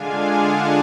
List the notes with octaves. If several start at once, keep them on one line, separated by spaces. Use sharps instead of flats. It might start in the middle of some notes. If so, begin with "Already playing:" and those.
Already playing: D3 G#3 D4 F4 F5 G#5
F#5 A5